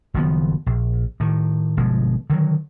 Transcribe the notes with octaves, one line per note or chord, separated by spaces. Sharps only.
F#1 D#3 F3 B3
A#1
A2 D#3
G1 B2 F3 G#3
D3 D#3 F#3